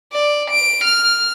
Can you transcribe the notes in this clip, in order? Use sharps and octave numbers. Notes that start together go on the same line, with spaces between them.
D5
D7
F6